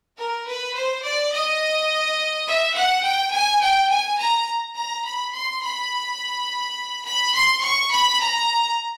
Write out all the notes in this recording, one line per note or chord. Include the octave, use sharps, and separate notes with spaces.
A#4
B4
C5
D5
D#5
E5
F#5
G5
G#5
G5
G#5
A#5
A#5
B5
C6
B5
B5
C6
C#6
B5
A#5